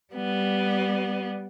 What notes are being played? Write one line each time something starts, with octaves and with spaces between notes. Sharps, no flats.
G3 B3